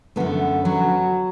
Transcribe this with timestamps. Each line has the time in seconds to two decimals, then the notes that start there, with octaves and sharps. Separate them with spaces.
0.16 F#2 D3 A3 B3 A4
0.65 F#3 F#4